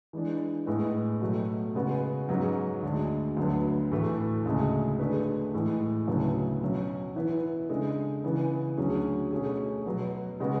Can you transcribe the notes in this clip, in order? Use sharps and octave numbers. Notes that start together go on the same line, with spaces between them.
E3 G#3 D4
A2 G#3 B3
B2 F#3 A3
C#3 G#3 B3 F#4
G#2 F#3 C#4 G#4 B4
D2 D3 G#3 D4
D2 D3 F#3 B3
A2 E3 A3
D2 C#3 G#3
D3 A3 D4 G#4 B4
A2 E3 G#3
D2 C#3 F#3 B3 E4
B2 F#3 C#4
E3 B3 E4 B4
C#3 G#3 D4 A4
C#3 E3 B3
D2 D3 F#3 C#4 G#4
B2 A3 C#4 G#4
B2 F#3 B3
C#3 G#3 B3 F#4